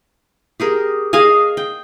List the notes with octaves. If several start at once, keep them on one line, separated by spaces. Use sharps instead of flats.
G4 G#4 A#4
G#4 D#5 F5 G#5
G5